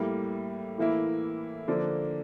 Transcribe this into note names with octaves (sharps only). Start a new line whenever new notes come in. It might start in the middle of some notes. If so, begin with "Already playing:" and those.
Already playing: A2 G3 A#3
A2 E3 A#3 E4
D3 F3 A#3 D4